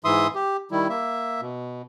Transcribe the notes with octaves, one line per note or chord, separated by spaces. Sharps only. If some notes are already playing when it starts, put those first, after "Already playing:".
G#2 E3 E5 C6 D#6
G4
D#3 G3 E4
A#3 E5
B2